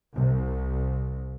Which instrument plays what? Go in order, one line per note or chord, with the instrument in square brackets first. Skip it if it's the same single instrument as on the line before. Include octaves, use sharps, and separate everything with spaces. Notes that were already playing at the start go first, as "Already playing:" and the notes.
[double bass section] C2